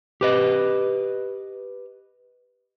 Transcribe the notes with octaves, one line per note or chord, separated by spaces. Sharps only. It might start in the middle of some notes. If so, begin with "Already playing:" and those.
G4 B4 D#5